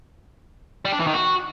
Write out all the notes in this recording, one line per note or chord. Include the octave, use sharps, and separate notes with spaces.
G3
D4
E3
D#3
F#4